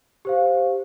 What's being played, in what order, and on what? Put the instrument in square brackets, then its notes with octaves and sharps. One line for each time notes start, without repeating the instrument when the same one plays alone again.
[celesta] G4 C5 F5